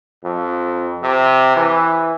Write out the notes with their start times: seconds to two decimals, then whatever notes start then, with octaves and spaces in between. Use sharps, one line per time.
0.24 F2
1.03 C3
1.56 E3